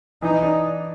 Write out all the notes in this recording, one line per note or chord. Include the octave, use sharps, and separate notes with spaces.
E3 D#4
D4